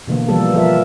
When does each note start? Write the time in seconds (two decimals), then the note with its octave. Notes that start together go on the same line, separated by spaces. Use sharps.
0.08 B2 D3 E3 A#3
0.29 E3 F3 G3 A#3 A4
0.55 F3 A4 A#4 E5